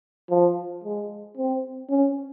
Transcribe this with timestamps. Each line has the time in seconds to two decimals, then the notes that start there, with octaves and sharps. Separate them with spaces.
0.30 F3
0.84 G#3
1.37 C4
1.89 C#4